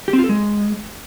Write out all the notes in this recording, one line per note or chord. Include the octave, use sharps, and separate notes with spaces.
G4
C4
F4
A4
G#3